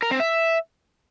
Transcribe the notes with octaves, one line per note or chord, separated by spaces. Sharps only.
A#4
C4
E5